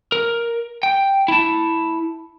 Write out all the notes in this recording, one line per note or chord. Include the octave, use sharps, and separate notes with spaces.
A#4
G5
E4 A5